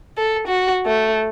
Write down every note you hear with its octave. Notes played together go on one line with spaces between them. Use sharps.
A4
F#4
A3